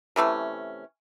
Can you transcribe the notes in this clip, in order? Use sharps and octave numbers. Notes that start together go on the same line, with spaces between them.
C3 E3 A3 C#4